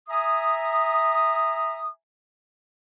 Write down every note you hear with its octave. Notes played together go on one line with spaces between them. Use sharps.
E5 G#5 A#5 D#6